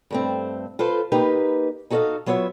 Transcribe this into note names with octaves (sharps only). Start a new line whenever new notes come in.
G2 A3 C4
F4 A4 B4 C5
A#3 D#4 G4 B4
D#4 F#4 A4 D5 D#5 F5
F#3 B3 F4 C#5 E5